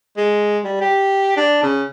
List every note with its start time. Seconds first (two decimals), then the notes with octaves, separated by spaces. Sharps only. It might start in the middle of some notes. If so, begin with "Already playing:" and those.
0.17 G#3
0.65 G3
0.81 G4
1.37 D4
1.63 C#3